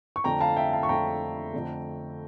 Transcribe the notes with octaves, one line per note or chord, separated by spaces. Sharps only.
C#6
F2 D3 A3 D4 G5 A#5
F5 A5
E5 G5
F5 A5
C#6
F2 D3 A3 D4 G5 A#5
F2 D3 A3